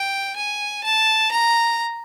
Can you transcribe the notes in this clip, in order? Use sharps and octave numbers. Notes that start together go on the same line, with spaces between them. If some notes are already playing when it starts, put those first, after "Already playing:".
Already playing: G5
G#5
A5
A#5